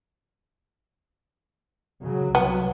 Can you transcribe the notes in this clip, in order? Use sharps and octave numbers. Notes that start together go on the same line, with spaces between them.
C#3 F#3
C2 F#3 B3